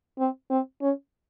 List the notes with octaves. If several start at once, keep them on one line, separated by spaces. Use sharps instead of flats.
C4
C4
C#4